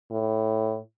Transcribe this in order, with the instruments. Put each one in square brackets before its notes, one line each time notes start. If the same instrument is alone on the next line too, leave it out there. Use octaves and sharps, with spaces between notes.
[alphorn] A2